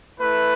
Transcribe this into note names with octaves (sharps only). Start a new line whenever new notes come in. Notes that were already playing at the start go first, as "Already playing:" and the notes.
A3 E4 B4